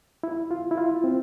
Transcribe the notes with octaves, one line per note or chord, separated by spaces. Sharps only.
E4
F4
E4
F4
C4